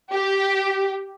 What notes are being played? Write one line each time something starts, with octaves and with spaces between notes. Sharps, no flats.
G4